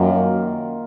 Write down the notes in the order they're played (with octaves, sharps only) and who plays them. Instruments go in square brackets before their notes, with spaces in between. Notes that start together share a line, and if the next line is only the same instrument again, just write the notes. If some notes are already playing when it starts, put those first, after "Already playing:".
Already playing: [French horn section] F#2 [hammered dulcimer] D#3 A#3 F4